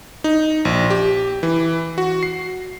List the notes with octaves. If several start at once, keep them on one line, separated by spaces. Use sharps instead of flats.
D#4
A#1
G4
E3
F#4
C7